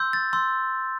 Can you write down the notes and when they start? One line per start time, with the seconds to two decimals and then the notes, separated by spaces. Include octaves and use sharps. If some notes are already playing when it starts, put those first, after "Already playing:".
Already playing: C6 E6 G6
0.13 A6
0.33 C6 E6 G6